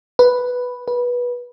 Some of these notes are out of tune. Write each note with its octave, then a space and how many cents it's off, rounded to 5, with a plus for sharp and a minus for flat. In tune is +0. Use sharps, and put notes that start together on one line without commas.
B4 +0
B4 -20